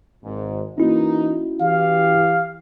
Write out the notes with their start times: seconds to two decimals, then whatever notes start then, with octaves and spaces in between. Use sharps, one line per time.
0.24 G#1 G#2
0.78 E3 A#3 C#4 D#4 E4 F#4
1.61 E3 G4 F5